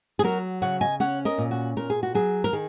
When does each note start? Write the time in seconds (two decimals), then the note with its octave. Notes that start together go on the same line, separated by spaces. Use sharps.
0.19 G#4
0.23 F#3 F#4 A#4
0.62 C#3 C#5 F#5
0.81 D#5 G#5
1.00 C#4 C#5 F#5
1.25 A#4 D#5
1.38 A#2
1.51 F#4
1.77 A#2 A#4
1.90 G#4
2.03 F#4
2.14 F#3 G#4
2.44 A#4
2.53 D#3 G#4